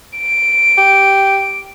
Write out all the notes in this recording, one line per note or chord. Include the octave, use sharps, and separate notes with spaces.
D7
G4